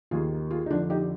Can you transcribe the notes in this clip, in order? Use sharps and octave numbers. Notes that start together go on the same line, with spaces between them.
D#2 D#3 F4 G#4
F4 G#4
D#4
F2 D3 F3 D4 F4
D#4 G4